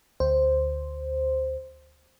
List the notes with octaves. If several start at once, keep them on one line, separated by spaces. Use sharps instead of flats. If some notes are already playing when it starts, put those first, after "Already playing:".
D2 C5